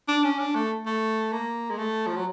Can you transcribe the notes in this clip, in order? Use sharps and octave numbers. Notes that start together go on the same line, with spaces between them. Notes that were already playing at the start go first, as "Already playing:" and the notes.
D4
C#4
D4
A3
A3
A#3
G#3
A3
F3
F#3